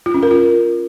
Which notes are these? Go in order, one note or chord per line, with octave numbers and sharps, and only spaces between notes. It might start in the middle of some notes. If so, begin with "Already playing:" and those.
F4
C#4
A#4
F4